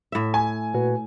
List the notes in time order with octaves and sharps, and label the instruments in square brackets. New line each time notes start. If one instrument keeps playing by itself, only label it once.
[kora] A2 E5
[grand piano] G#5
[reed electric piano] A#2 F#4 B4